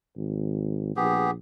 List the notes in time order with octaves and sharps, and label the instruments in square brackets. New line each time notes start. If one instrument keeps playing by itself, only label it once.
[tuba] G#1
[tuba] A#1 [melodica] B3 G4 G#4